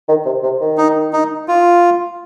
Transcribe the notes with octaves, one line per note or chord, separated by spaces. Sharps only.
D#3
C3
C3
D#3
D#4
D#4
F4